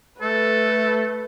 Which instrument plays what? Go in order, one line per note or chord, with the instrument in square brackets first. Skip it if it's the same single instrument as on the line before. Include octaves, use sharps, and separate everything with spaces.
[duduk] A3 [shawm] A4 [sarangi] B4